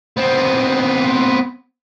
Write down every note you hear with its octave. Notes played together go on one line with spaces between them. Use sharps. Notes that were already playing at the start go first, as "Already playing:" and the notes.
B3 C4